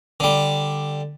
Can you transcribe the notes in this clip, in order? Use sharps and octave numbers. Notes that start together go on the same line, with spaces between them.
D3 G3